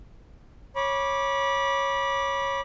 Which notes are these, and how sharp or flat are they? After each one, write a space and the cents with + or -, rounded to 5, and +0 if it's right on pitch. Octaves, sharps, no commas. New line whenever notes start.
C#5 -10 B5 -25 D6 +0